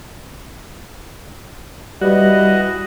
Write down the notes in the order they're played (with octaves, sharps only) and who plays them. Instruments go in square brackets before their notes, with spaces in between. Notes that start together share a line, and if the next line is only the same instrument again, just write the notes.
[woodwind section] E3 B4 D#5 [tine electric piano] G3 [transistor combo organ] F#4